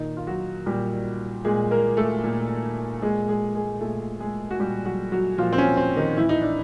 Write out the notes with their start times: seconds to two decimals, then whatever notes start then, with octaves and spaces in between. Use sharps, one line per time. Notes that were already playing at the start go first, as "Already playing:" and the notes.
Already playing: A#2 D#3 D#4
0.17 F4
0.27 F#3 F#4
0.66 A#2 G3 G4
1.45 A#2 G#3 G#4
1.71 A#3 A#4
1.97 A3 A4
2.24 A#2
3.02 A#2 G#3 G#4
3.28 G#3 G#4
3.55 G#3 G#4
3.81 A#2 A3 A4
4.20 G#3 G#4
4.51 F#4
4.59 A#2 G3 G4
4.85 F#3 F#4
5.12 F#3 F#4
5.38 A#2 F3 F4
5.53 C4
5.58 C#4
5.77 C4
5.97 D#3 D#4
6.17 A2 E3 E4
6.29 D#4
6.42 D4